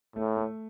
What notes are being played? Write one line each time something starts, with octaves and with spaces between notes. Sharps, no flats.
A2 A3
A3